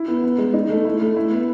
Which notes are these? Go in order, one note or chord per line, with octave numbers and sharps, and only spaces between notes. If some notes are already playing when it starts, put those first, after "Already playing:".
Already playing: E4
B3
B3
G#3
D#4
A3
E4
A3
E4
B3